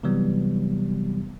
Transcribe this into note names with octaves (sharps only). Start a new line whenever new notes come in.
C3 E3 F#3 G3 B3